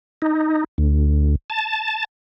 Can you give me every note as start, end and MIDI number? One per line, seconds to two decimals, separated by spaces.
0.22 0.64 63
0.78 1.35 38
1.50 2.04 81